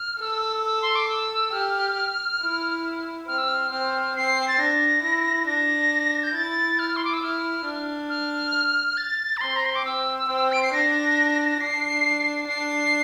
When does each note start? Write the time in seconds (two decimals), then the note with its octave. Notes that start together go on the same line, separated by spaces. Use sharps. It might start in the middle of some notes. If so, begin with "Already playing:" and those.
Already playing: F6
0.21 A4 E6
0.65 E6
0.82 C6
0.96 D6
1.09 E6
1.52 G4 F6
2.41 E4
3.28 C4 F6
3.38 E6
3.48 F6
3.71 C4 F6
4.15 C4 C7
4.48 A6
4.59 D4 A#6
5.03 E4
5.47 D4 A#6
6.23 G6
6.35 E4 A6
6.79 F6
6.96 C6
7.05 D6
7.14 E6
7.23 E4 F6
7.65 D4
8.10 F6
8.97 A6
9.37 A#5
9.41 C4 C6
9.56 A#5
9.65 C6
9.75 D6
9.85 C4 E6
10.28 C4
10.52 D7
10.63 C7
10.73 D4 A#6
11.60 D4 C7
12.47 D4 C7